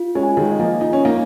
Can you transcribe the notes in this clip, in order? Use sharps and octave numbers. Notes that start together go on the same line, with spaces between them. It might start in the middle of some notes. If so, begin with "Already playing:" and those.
Already playing: F4
G#3 C#4
G#5
D#3 G#3
D#5
F3 A#3
D#4 F4
C#4
A#3 D#4